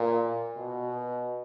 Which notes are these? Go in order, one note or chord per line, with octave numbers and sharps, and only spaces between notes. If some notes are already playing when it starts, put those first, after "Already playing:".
Already playing: A#2
B2